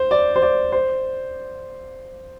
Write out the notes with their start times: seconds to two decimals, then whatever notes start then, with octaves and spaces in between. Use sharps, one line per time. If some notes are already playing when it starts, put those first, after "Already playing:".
Already playing: C5
0.11 D5
0.36 C5
0.42 D5
0.72 C5